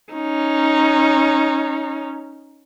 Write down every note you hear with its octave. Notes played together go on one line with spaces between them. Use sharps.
C#4 D#4